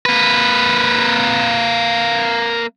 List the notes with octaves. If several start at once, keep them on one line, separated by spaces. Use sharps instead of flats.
A#3 B4